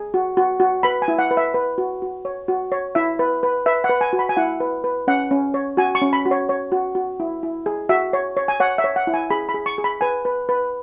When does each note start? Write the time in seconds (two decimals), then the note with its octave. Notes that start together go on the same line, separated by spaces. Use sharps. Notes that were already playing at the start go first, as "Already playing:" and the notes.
Already playing: G#4
0.14 F#4
0.37 F#4
0.60 F#4
0.83 B4 B5
1.02 G#5
1.08 E4
1.19 F#5
1.31 B4
1.37 E5
1.54 B4
1.78 F#4
2.02 F#4
2.25 C#5
2.48 F#4
2.72 C#5
2.95 E4 E5
3.19 B4
3.43 B4
3.66 B4 E5
3.84 F#5
3.89 B4
4.01 G#5
4.13 F#4
4.19 B5
4.29 G#5
4.37 E4 F#5
4.60 B4
4.84 B4
5.08 C#4 F#5
5.31 C#4
5.54 C#5
5.77 F#4 G#5
5.95 C#6
6.02 C#4
6.13 B5
6.26 F#4
6.31 C#5
6.49 C#5
6.72 F#4
6.95 F#4
7.20 E4
7.43 E4
7.66 G#4
7.89 F#4 E5
8.13 C#5
8.37 C#5
8.48 G#5
8.60 C#5 F#5
8.78 E5
8.84 C#5
8.96 F#5
9.07 E4
9.14 G#5
9.30 G#4 B5
9.49 B5
9.54 G#4
9.66 C#6
9.78 G#4
9.84 B5
10.01 B4 G#5
10.25 B4
10.49 B4